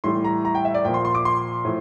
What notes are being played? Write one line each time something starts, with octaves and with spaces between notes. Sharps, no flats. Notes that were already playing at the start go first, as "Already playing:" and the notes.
A2 E3 G3 C6
A#5
A#5
G5
E5
D5
A#2 F3 G5
C6
C6
D6
C6
A2 F3